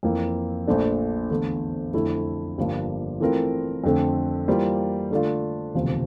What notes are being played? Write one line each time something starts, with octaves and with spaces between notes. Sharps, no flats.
F2 E3 A#3
A#1 A#2 A3 D4
E2 D3 A3
F2 D3 A3 E4 A4
G1 G2 F3 A#3
E3 A3 C4 F4 A#4
F2 D3 A3 C4
E3 G3 A#3 F4 C5
D3 A3 D4 F4
E1 D2 C3 F3